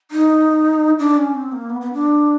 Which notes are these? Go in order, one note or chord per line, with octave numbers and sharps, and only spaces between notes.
D#4
D4
C#4
C4
A#3
B3
B3
D4